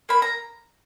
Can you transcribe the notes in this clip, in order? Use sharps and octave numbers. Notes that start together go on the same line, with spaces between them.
A#3 B5
A#5